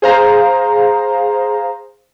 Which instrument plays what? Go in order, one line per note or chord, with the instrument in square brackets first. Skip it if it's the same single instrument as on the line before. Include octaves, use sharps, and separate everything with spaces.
[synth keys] G#4 C5 F5 A#5